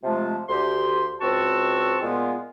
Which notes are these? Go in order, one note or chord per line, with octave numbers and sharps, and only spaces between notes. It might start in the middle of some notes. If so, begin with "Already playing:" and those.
C3 F3 G#3 A3 F4 A5
D2 G4 C6
C#2 C4 F#4 A5 C#6 E6
A#2 G#3 B3 F4